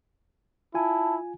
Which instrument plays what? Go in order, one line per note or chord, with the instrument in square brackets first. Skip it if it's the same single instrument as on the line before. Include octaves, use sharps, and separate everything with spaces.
[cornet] E4 [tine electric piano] F4 G#5 [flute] A5